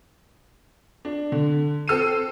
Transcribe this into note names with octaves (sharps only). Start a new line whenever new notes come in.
D4
D3
C4 A4 E6 C7 D#7